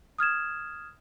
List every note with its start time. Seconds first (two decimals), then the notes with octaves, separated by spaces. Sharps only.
0.19 D#6 F6 G#6 E7